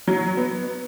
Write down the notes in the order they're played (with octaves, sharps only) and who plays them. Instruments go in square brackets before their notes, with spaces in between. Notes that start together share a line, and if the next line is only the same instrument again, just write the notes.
[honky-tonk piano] F#3
B3